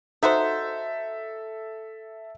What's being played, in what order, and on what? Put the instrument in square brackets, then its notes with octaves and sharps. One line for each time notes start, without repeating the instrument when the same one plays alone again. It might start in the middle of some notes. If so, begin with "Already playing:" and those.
[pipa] D#4 F#4 C5 [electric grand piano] A4 E5